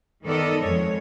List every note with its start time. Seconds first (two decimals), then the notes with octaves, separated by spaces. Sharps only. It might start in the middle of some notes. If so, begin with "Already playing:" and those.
0.25 D#3 B3 A4 D5 D#5
0.62 F2 G#3 C#5